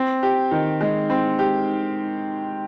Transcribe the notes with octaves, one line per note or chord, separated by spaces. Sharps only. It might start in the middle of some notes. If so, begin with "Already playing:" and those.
Already playing: C4
G4
D#3
G#3
C4
G4